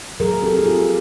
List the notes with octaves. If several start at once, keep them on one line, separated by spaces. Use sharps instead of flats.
F#3 G#4 A#4
C4 G4 A4
G#4
C4 F4 G4